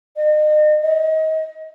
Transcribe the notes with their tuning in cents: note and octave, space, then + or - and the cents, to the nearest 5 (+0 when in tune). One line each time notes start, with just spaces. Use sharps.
D#5 -40
D#5 +30